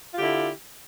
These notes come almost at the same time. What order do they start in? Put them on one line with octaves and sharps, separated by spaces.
F4 G4 D3 E4